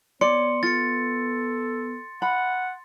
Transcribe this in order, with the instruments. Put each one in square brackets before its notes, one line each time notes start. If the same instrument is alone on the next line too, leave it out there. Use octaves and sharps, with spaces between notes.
[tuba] B3 [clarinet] C#5 [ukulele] D5 [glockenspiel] C6 C#7
[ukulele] F4 [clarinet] A4 [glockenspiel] A6 C#7
[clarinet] F#5 [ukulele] B5